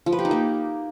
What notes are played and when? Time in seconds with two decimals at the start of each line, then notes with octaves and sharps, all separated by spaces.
0.06 F3
0.13 B4
0.19 G4
0.25 D#4
0.31 A#3